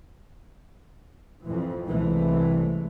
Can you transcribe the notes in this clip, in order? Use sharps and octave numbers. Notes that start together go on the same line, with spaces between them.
F2 E3
C2 C3 E3 G#3 A3